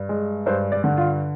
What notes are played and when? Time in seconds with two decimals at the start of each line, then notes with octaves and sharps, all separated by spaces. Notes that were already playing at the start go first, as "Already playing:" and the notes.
Already playing: G2
0.09 G#3
0.46 G2 C5
0.72 D5
0.84 D3
0.97 F4